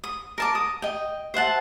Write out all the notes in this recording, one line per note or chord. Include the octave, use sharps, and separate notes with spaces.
D#6
A#4 A5 D6
D#6
D#5 G5
C5 E5 F#5 A5